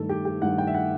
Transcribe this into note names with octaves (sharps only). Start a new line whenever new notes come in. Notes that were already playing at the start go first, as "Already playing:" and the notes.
Already playing: G2 D#3 A3 A4
G4
G4
G2 D#3 A3 F#5
G5
E5
F#5